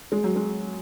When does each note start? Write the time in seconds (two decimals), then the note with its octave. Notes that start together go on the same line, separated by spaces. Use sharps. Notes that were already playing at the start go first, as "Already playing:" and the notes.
0.12 G#3
0.24 F#3
0.36 G#3